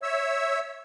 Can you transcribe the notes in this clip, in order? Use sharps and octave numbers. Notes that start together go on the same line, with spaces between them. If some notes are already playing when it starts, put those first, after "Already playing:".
C#5 E5 E6